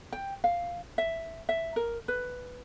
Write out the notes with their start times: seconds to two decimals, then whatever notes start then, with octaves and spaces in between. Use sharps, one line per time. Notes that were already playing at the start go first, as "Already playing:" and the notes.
0.12 G5
0.44 F5
0.98 E5
1.49 E5
1.76 A#4
2.08 B4